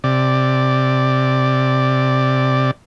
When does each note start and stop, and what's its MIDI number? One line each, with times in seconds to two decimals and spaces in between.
0.04 2.71 48
0.04 2.71 74